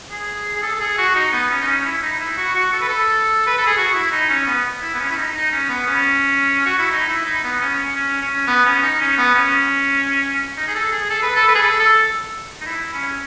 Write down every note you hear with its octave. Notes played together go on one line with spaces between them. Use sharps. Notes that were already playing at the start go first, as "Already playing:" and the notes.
G#4
G#4
A4
A4
G#4
F#4
D#4
B3
C#4
D#4
C#4
E4
D#4
E4
F#4
F#4
A4
B4
A4
B4
A4
G#4
F#4
E4
D#4
C#4
B3
E4
B3
C#4
E4
D#4
D#4
C#4
B3
C#4
F#4
E4
D#4
E4
D#4
B3
C#4
C#4
C#4
C#4
B3
C#4
D#4
C#4
B3
C#4
D#4
G#4
A4
G#4
A4
B4
A4
B4
G#4
A4
A4
D#4
E4
C#4